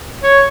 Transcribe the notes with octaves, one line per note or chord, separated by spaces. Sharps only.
C#5